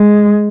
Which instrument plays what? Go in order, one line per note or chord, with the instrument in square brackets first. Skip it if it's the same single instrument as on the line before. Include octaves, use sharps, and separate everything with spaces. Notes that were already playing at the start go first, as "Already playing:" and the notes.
Already playing: [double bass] G#3